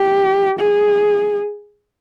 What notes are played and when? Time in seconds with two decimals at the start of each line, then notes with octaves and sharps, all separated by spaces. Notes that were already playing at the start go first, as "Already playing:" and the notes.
Already playing: G4
0.59 G#4